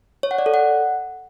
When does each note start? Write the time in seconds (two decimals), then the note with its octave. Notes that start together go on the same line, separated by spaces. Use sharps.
0.23 C#5
0.31 F#5
0.38 D5
0.46 A4
0.54 F#5